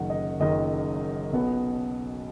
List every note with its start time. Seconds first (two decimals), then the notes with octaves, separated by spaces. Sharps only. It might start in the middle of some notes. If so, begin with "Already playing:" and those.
Already playing: F#1 F#2 D#3 F#5
0.10 D#5
0.40 F#1 F#2 D#3 D#5
1.33 B1 B2 B3